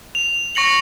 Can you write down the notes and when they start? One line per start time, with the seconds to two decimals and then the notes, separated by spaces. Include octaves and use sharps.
0.15 F7
0.55 C#6 A#6 C#7 F#7